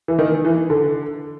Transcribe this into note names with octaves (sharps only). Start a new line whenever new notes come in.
E3
D#3
E3
D3